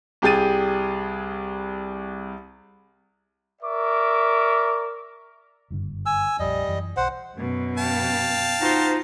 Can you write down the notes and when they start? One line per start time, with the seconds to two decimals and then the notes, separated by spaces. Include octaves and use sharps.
0.22 C2 G4 G#4 A6 D#7
3.62 A#4 D5 E5 C#6 D6
5.70 F#1 G2 D3
6.06 G#5 E6
6.39 A#1 F2 G3 D#5
6.68 F#2 E3
6.97 B1 C5 F#5
7.35 F#2 B2
7.78 F5 G5 A5
8.61 D#4 F4 F#4 C5